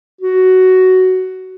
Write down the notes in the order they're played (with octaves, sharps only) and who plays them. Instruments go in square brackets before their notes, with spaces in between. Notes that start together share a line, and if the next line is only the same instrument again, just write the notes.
[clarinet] F#4